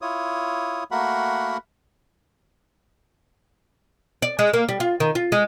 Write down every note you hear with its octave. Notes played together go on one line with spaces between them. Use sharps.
E4 F4 C#5 D#6
A3 A#3 F#4 A#4 F#5 B5
D5
G#3
A#3
G3
F4
D#3
F4
G#3